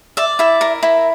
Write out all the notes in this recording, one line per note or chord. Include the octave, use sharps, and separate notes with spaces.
D5 E5
E4 E5
A#4
E4